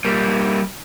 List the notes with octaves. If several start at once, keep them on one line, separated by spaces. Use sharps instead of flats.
G3 A#3